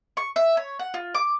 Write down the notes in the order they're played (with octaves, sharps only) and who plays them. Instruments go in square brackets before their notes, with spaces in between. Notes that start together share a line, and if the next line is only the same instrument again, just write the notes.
[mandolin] C#6
E5
C#5
F#5
F4
D6